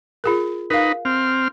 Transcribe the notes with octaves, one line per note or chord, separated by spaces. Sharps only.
F4 G#4 A#4
D#4 A#4 B4 F5
C4 F6